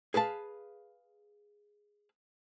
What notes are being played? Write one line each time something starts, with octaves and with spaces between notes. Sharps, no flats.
G#4 B4 F5 A5